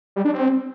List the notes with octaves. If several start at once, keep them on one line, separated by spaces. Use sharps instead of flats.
G3
D4
C4